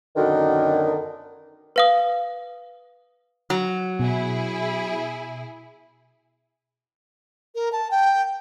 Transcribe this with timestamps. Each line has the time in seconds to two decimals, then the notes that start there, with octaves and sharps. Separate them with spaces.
0.17 F#2 B2 D3 D#3
1.76 B4 F5 D#6
3.50 F#3
4.00 B2 E4 G#4
7.55 A#4
7.72 A5
7.91 G5